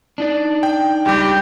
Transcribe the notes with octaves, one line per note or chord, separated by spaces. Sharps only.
D4 D#4 D5
G5
C#2 G3 G4